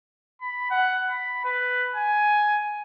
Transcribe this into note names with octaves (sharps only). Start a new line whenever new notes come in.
B5
F#5
B5
B4
G#5